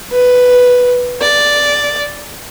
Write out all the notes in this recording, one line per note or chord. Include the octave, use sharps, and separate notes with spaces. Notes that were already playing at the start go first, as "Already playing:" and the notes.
B4
D5